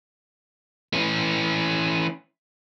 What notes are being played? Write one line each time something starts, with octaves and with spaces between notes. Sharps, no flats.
E3 C#4